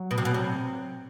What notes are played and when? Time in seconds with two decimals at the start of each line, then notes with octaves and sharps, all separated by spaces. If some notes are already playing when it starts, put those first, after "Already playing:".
Already playing: F#3
0.11 B2
0.18 C3
0.25 B2
0.34 C3